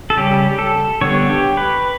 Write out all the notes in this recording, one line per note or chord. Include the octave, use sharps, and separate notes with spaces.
A4
C#3 G3 C#4 G4
A4
D3 G3 B3 D4 C#5
G4
B4